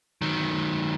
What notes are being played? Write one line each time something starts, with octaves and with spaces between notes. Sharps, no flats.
D#3 F#3